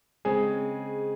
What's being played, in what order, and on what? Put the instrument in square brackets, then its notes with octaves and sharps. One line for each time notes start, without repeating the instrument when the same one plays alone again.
[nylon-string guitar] C#3 G#3 C4 [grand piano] G#4